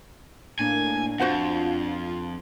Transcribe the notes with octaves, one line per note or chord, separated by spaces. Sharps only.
A2 A#3 D4 G#5
F2 F4 F#4 C5 F#5